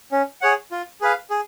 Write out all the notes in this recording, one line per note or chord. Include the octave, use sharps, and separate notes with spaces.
C#4
G#4 C#5 F#5
F4
G#4 B4 F5
G#4